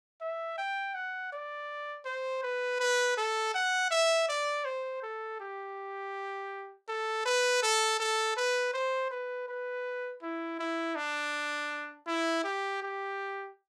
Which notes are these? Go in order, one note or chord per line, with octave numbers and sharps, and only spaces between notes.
E5
G5
F#5
D5
C5
B4
B4
A4
F#5
E5
D5
C5
A4
G4
A4
B4
A4
A4
B4
C5
B4
B4
E4
E4
D4
E4
G4
G4